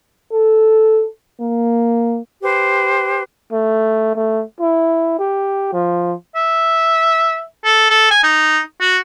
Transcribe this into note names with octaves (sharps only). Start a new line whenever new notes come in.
A4
A#3
G4 B4 C5
A3
A3
E4
G4
F3
E5
A4
A4
G#5
D#4
F#4